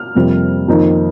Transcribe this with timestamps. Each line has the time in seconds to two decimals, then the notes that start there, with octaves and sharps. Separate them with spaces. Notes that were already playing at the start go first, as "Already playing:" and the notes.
Already playing: F6
0.15 F2 C3 G3 A#3
0.68 F2 D#3 A#3 D#4